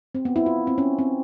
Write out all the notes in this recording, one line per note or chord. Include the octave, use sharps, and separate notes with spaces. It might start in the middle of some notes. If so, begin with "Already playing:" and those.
C4
B3
E4
F4
C4
C#4
C4